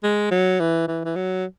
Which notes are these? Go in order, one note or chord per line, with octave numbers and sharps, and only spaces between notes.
G#3
F#3
E3
E3
E3
F#3